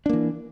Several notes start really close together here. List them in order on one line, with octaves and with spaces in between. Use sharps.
D4 A#3 E3